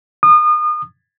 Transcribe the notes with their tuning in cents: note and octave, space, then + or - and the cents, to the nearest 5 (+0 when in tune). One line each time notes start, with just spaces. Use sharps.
D#6 -35